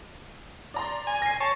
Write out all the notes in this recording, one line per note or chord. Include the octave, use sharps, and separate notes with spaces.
D5 A#5 C6
G#5
A#6 C7
C#5 A5